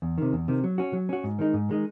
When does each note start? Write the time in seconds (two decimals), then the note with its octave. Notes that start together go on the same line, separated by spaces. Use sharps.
0.02 E2
0.18 C3 D#3
0.33 E2
0.48 C3 D#3
0.64 F#3
0.78 C#4 F#4
0.93 F#3
1.09 C#4 F#4
1.24 G#2
1.39 D#3 G#3 D#4
1.54 G#2
1.69 D#3 G#3 D#4